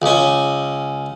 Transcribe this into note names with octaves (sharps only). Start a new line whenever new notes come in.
C#2 C#4